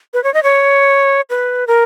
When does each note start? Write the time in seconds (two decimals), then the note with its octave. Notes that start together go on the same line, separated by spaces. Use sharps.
0.14 B4
0.24 C#5
0.34 D#5
0.43 C#5
1.30 B4
1.67 A#4